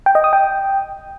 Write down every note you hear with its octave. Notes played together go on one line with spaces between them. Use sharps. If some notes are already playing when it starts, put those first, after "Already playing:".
G5
D#5
D#6
G5